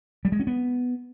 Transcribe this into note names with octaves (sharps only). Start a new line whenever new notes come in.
G3
G#3
C#4
B3